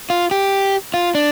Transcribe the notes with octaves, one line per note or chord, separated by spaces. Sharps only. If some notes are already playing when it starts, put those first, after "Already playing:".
F4
G4
F4
D4